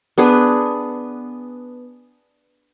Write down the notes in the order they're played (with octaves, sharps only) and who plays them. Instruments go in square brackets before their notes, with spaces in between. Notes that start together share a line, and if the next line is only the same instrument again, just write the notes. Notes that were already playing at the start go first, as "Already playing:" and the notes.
[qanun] B3 D4 G#4 B4